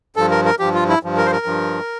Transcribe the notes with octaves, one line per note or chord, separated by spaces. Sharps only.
G2 F3 A4
A#4
A#4
G2 F3 G4
F4
E4
G2 F3
A#4
C5
A#4
G2 F3